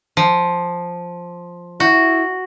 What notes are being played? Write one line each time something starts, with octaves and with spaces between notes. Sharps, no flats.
F3
E4 F#4